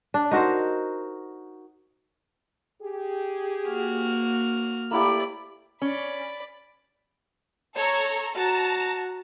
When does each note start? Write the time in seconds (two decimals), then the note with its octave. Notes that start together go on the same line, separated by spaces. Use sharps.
0.14 D4
0.31 D#4 F#4 A#4 C5
2.82 G4 G#4
3.68 A#3 F#4 F6
4.91 A3 A#3 E4 G4 D5 B5
5.82 C#4 D5 B5
7.75 A4 C#5 A#5 C#6
8.35 F#4 A5 A#5